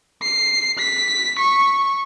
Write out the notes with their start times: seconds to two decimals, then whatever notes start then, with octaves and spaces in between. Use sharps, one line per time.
0.23 C7
0.79 B6
1.39 C#6